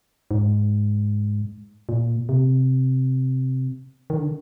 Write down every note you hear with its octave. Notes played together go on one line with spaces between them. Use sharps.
G#2
A#2
C3
D#3
D3